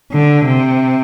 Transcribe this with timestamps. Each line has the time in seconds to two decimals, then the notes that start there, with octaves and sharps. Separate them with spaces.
0.12 D3
0.46 C3